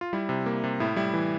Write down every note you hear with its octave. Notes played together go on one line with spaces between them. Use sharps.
F4
G3 E4
C3
A#3
C3
A2 E4
G3 E4
E3